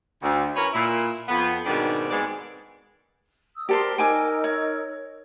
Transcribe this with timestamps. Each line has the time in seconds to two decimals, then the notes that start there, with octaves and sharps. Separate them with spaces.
0.22 D2
0.56 C#4 E4 A#4 B4 C#5
0.74 A#2 E4
1.29 F2 B3
1.66 G#2 B2 D#3 G3 C4 D4
2.11 G#2 G#3 B3 C4 D5
3.56 D#6 E6
3.69 G4 A4 A#4 C5 D5 C6
3.98 D#4 A#4 G5 G#5 D6 E6
4.44 C#5